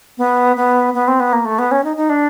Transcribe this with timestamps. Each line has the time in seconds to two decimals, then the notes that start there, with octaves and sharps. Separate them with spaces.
0.18 B3
0.57 B3
0.94 B3
1.08 C4
1.20 B3
1.33 A#3
1.45 A3
1.59 B3
1.71 C#4
1.84 D#4
1.97 D#4
2.09 D4